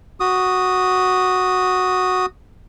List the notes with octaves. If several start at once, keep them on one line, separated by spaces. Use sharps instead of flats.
F#4 D#6